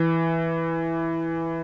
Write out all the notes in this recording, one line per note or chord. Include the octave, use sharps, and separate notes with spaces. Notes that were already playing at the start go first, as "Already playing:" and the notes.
Already playing: E3